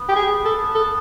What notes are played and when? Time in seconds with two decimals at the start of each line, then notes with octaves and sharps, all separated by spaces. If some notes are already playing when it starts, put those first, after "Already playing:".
Already playing: B3
0.08 G4
0.16 G#4
0.45 A4
0.75 A4